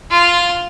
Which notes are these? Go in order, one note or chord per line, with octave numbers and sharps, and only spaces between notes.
F4